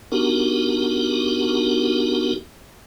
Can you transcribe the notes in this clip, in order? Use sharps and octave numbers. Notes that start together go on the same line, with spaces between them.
B3 D4 D#4 F#4 G4 A#4